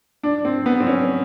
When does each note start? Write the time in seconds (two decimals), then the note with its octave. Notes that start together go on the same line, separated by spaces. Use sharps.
0.23 D4
0.45 C4
0.66 B3
0.80 C4
0.87 C#4